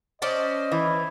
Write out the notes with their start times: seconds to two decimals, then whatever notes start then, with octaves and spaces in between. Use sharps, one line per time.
0.22 C#4 C5 D5 D#5 A5
0.72 E3